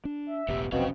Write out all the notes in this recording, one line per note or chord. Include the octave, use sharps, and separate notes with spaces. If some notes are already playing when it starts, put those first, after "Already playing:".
D4
E5
E1 A1 B3 G4
F1 B1 B2 C4 C#4 F5